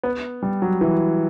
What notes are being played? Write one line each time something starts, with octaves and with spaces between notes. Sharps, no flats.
B3
G3
F#3
E3